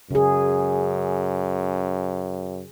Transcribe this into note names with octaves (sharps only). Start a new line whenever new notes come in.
F#2 C#3 G#4